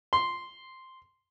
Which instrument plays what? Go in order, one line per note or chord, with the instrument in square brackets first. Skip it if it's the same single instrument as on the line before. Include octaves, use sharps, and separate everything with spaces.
[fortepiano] C6